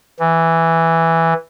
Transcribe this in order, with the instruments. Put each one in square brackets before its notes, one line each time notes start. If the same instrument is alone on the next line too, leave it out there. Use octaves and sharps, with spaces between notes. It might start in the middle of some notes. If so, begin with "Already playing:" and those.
[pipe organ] E3